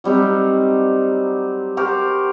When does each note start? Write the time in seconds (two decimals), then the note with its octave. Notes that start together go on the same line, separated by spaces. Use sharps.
0.04 F#3 G3 C4 D#4
1.77 F#4 G4 A#4 C5